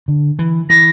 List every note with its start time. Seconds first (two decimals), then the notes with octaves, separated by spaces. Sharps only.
0.08 D3
0.39 E3
0.69 E3 A#6